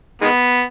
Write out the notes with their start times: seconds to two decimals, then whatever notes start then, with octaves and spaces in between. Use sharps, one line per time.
0.22 D#3 G#3 B3